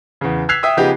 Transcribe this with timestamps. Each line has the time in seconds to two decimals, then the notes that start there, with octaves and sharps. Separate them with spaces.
0.21 E2 C#3
0.49 E6 F#6 G#6 B6 C7 F7
0.63 E5 G5 D#6 E6
0.77 C#3 F3 B3 D#4 G4 G#4